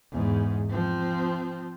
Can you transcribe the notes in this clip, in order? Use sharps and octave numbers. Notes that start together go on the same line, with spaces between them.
E2 G#2
F3 C4